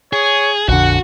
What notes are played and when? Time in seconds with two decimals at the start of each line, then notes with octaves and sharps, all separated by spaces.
0.13 G#4 C#5
0.69 A#1 F2 D3 F#4 F#5